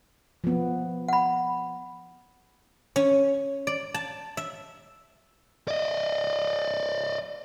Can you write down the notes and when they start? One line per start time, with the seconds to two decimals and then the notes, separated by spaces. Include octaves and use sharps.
0.44 F3 B3
1.08 F#5 B5
2.96 C#4
3.67 D5
3.94 A5
4.37 E5
5.68 D5 D#5